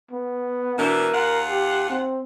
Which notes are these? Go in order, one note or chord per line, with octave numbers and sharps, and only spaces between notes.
B3
B2 E3 D4 A#4
D#2 F4 F#5
G4
C4